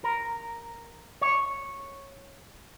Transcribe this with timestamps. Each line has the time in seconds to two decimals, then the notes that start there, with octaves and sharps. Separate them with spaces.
0.04 A#4
1.21 C#5